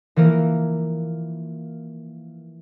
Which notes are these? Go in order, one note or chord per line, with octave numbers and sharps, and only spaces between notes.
E3 F3 A#3 A#4